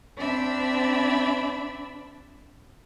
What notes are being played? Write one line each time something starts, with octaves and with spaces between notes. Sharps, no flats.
C4 D4 D5 E5 B5